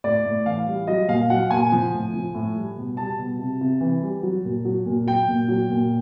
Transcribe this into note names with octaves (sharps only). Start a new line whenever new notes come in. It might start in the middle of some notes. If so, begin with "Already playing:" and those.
A2 D5
A2
E3 F5
G3
F#3 D#5
A#2 F5
F#3 F#5
A#2 G#5
F3
A2
F3
A2
G3
B2
G3 A5
B2
C3
C3
E3
G3
F#3
A#2
F#3
A#2
F#3 G5
A#2
F#3
A#2